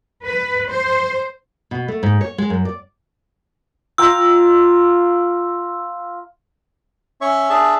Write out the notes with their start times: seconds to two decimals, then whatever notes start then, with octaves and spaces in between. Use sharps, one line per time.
0.25 B4
0.68 C5
1.71 B2
1.88 A3
2.03 G#2
2.21 C#5
2.38 G#3
2.50 F#2
2.65 D5
3.98 F4 G5 A#5 E6
7.21 C#4 C#5 E5 C#6
7.50 D4 G#4 E5 A5